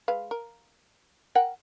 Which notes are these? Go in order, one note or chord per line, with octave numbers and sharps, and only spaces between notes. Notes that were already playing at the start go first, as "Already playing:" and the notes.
G#3 B4 F5
A#4
A#4 F#5 G5